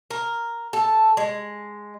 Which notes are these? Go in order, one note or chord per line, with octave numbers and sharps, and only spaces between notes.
A#4
A4
G#3